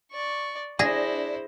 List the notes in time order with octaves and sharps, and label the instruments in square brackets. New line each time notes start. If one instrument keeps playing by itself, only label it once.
[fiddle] D5 C#6
[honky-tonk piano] D4 A#6 [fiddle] E4 C5 [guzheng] G#4